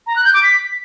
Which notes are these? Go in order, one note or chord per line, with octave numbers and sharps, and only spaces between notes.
A#5
F#6
G6
D6
B6